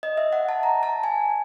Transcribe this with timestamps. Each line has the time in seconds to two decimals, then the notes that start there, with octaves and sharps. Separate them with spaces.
0.03 D#5
0.17 E5
0.33 F#5
0.49 A5
0.63 A#5
0.83 A5
1.03 G#5